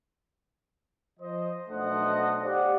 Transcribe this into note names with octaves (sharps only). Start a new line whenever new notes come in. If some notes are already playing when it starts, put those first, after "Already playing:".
F3 C5 D#5
B1 A3 D4 C5 D#5 F#5
G4 C5 D5 F5 F#5